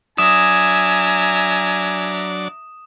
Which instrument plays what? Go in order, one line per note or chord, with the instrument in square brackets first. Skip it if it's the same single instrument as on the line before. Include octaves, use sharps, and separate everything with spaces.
[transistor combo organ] F#3 D4 D5 [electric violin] E5 A#5 [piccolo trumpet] G#5 [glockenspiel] D#6 E7